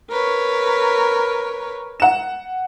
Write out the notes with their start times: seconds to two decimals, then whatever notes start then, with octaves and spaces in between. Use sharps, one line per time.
0.10 A#4 B4 C#5
2.00 F#5 E7